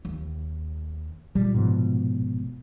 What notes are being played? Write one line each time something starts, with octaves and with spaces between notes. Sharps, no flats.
D#2
A#2 G3 G#3
G#2 B2 F3